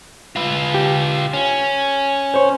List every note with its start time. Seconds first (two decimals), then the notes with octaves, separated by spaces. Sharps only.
0.36 F4 B4
0.74 G4
1.34 C#4
2.34 C5 C#5